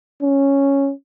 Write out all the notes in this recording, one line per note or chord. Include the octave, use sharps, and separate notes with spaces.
C#4